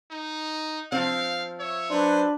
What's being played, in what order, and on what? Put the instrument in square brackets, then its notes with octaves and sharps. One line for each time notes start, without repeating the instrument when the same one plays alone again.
[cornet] D#4
[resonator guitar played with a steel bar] F3 C4 [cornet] F5
[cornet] C#5 [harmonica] E5
[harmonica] F#3 B4 C5 [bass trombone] D4